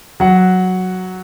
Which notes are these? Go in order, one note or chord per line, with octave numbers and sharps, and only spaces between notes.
F#3 F#5